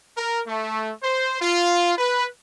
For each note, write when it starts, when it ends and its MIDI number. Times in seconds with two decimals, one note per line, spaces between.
0.16 0.40 70
0.47 0.91 57
1.02 1.37 72
1.41 1.92 65
1.97 2.26 71